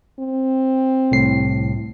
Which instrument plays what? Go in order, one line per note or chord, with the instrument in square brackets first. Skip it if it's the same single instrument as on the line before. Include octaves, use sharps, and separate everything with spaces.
[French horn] C4
[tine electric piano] C2 A2 C7